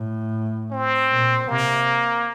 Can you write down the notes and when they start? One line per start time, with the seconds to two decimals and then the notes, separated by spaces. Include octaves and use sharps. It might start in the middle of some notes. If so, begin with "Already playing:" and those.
Already playing: A2
0.71 C4
1.10 A#2
1.48 C3 A#3